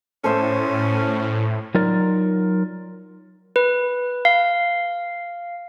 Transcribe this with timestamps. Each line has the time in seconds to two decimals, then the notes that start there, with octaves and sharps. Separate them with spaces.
0.24 A2 C#4 A4 C5 E5
1.74 F#3 D#4 F4 A#4 D5
3.56 B4
4.25 F5